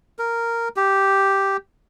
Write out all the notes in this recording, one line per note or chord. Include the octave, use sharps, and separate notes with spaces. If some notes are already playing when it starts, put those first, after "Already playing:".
A#4
G4